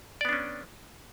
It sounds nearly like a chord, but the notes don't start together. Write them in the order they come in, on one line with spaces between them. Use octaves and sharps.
D5 B3 D4 C#4